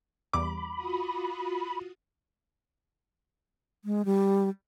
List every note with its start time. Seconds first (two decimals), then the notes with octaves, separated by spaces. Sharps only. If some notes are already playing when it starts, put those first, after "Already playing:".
0.33 E2 G3 B5 D6
0.75 F4 F#4 D#6
3.85 G#3
4.05 G3